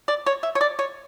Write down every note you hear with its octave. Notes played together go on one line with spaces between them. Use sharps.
D5
C#5
E5
C#5
D5
C#5